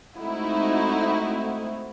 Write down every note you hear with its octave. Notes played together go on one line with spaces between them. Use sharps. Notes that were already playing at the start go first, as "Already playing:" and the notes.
G#3 A3 C4 D#4 E4 F#4